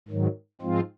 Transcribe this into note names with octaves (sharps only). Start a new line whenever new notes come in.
G#2 D#3 F#3
G#2 F3 G#3 C4 F4